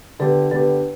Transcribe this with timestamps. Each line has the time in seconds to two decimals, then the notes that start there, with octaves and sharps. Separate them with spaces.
0.20 D3 B3 G4 B4
0.51 D3 B3 G4 B4